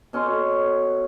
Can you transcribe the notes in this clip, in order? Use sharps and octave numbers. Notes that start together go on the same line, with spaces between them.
B2 C#4 A4 C6